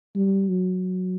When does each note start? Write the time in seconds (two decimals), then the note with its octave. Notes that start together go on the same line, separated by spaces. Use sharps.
0.15 G3
0.48 F#3